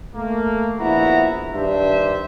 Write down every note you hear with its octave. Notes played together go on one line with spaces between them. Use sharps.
A3 A#3
A#1 B3 E4 F#4 A#5
G2 D#3 D4 C5 E5